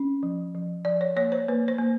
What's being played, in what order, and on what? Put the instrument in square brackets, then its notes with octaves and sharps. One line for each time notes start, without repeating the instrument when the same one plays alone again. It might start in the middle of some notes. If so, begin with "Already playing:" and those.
Already playing: [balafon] C#4
F3
F3
F3 D5
C#5
A#3 C#5
C5
A#3 B4
C5
A#3